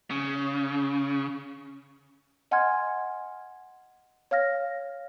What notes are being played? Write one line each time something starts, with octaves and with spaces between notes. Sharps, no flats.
C#3
D#5 F#5 G#5 C6 F6 G#6
C#5 F5 F6 A#6